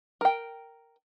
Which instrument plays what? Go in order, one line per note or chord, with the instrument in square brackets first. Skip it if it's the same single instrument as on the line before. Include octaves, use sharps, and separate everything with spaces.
[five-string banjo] A#4 G5